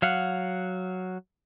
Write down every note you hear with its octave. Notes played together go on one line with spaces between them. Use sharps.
F#3 F5 F#5